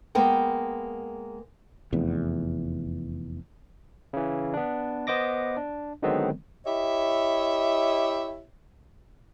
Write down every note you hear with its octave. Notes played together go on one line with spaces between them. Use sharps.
G#3 A#3 B3 G5
F1 E2
C#3 E3
B3 D4
B3 C5 D#5 D6 A#6
D4
D3 D#3 F#3 G#3 B3 C4
E4 G4 C#5 D#5 E5